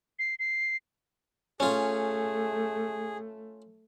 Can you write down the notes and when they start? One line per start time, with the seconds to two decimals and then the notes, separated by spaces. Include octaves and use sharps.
0.19 C7
0.39 C7
1.60 A3 C#4 F4 G#4